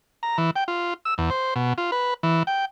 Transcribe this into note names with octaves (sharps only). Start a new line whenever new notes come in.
A#5
E3
G5
F4
E6
E2
C5
B2
F4
B4
E3
G5